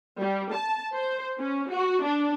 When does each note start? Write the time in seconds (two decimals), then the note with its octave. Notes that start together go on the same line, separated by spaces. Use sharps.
0.21 G3
0.54 A5
0.95 C5
1.39 C#4
1.70 F#4
2.04 D4